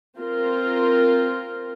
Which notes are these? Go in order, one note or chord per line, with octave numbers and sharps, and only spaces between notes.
C4 F4 A#4